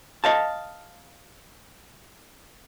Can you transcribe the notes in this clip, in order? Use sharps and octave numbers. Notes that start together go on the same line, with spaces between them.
D#5 F5 A5